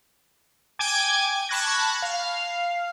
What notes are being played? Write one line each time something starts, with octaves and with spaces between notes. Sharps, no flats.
G5 G#5 D6 G#6
A5 B5 C#6 F#6 G#6 A#6
F5